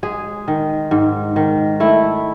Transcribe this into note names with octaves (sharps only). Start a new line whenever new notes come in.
G#3 G#4
D#3
G#2
D#3
A3 E4